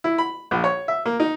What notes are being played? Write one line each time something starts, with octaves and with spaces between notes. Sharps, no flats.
E4
B5
A#1
C#5
E5
A#3
D#4